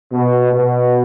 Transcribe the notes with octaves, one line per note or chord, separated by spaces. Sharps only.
B2
B2